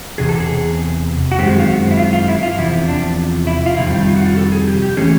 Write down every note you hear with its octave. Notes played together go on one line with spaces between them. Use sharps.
E2 C3 G#4
A4
G#4
F#4
F#2 D#3 G#3 C4 G4
F4
F#4
E4
F4
F4
E4
F4
E2 C3 F3 E4
D4
E4
F4
F2 C3 D#3 G3 E4
F4
F#4
F4
A4
G#4
G4
G4
C3 E3 A3 C#4 G#4